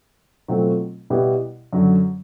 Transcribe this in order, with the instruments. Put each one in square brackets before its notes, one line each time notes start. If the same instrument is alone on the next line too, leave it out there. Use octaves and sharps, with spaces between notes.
[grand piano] B2 F#3 A3 C4 F4
B2 G3 B3 E4 G4
F#2 D3 F#3